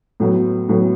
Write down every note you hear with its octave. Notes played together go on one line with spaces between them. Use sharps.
A2 F#3 B3
A2 F#3 B3